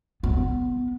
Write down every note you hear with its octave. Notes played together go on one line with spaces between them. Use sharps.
B3